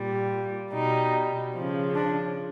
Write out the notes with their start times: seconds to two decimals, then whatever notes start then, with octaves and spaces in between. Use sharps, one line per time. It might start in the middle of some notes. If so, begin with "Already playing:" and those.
Already playing: A#2 G3
0.72 B2 G3 D#4
1.55 C#3 F3
1.95 D4